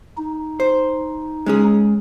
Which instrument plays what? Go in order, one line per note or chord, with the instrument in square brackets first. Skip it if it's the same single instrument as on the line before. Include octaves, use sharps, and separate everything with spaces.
[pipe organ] D#4
[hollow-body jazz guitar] C5
G#3 C#4 G#4